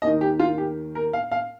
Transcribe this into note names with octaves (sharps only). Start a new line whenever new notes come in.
D#2 D#3 D#5
G4
F4
G4
A#4
F5
F5